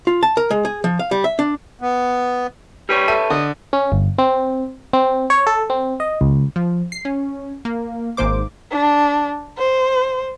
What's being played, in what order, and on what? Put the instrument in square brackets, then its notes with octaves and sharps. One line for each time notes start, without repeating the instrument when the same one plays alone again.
[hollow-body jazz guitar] F4
A5
A#4
G#3
G#4
F3
F5
G3
E5
D4
[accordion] B3
[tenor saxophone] G3 [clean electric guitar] G4 B4 C#5
[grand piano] A4 E5 D#7
[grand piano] D3 [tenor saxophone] D#5
[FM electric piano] C#4
G1
C4
C4
C#5
A4
C4
D#5
C#2
[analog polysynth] F3
C7
C#4
A#3
G#1 G#2 A#3 C5 D6
[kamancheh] D4
C5